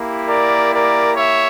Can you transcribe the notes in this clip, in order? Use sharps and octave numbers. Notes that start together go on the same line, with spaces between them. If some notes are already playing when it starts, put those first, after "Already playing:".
Already playing: A#3 E4 G4
A#4 D5
A#4 D5
C#5 E5